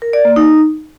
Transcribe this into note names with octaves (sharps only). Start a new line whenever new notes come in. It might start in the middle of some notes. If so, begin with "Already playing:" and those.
A#4
D5
A#3
D#4